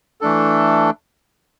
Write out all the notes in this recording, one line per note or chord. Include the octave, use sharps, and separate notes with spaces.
E3 A3 D4 A4